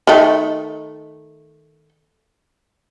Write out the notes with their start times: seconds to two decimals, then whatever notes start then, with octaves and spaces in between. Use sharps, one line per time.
0.07 D#3 A3